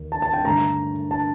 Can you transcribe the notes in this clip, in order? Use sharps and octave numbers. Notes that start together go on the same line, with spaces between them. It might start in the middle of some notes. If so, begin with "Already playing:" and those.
Already playing: D#2 D#3
A5
A5
G5
G2 D3 A3 A#5
A5